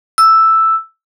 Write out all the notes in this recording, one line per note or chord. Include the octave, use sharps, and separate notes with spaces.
E6